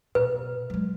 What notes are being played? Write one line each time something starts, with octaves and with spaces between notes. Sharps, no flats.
B2 B4
F#3 G#3